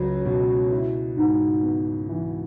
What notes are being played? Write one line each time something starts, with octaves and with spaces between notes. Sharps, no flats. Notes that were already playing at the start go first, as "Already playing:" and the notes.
Already playing: C#2 F#3
B2
E4
G#2
B3
E3